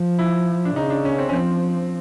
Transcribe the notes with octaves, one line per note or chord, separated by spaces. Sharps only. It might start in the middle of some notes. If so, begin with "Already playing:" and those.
Already playing: F3
E4
D4
C#3 D#4
D4
C#4
C4
C#4
F3 C4